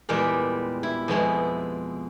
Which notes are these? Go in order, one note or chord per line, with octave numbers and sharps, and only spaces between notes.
E2 A#2 G3 G#3 G4 A#4
E4
F2 B2 G#3 E4